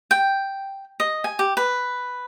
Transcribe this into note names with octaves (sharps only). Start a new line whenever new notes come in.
G5
D#5
G#5
G4
B4